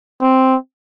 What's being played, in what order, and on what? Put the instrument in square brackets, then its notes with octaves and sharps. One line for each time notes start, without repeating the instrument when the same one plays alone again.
[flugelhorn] C4